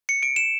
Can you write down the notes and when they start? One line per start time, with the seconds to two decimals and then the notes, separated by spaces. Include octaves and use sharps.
0.09 C#7
0.23 D7
0.36 E7